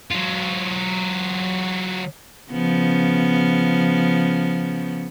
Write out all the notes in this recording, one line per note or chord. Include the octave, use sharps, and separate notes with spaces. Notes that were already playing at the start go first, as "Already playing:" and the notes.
F#3 F4
C#3 F3 B3